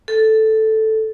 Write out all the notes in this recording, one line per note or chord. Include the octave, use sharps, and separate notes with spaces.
A4